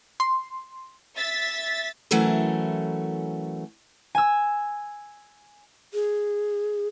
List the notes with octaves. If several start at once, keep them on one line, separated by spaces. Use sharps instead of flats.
C6
E5 A6 B6
E3 F#3 A3 C#4 A4 A#4
G#5 E6
G#4